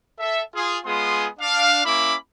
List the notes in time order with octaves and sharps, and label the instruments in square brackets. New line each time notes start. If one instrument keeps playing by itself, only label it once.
[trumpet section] A4 E5
F4 G#4
G#3 B3 F4 G#4 C6 D#6
D4 F5
A#3 C#4 E4 B5 D6